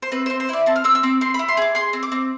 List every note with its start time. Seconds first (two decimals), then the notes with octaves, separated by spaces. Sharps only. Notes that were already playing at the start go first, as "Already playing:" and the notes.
0.02 C5
0.12 C4 B4
0.26 C4 C5
0.40 C5
0.49 E4 D5
0.66 C4 A5
0.76 F6
0.84 C4 E6
0.95 E6
1.03 C4 D6
1.21 C4 C6
1.34 B5
1.39 E4
1.49 C6
1.57 G#4 D6
1.75 G#4 C6
1.93 C4
2.03 D6
2.12 C4